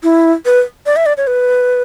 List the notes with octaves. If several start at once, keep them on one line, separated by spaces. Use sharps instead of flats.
E4
B4
D5
E5
D5
C#5
B4